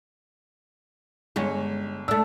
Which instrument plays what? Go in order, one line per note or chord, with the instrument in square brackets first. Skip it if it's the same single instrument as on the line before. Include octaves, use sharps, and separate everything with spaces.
[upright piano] G1 [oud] G#3 C#4
[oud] A3 D4 [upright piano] E6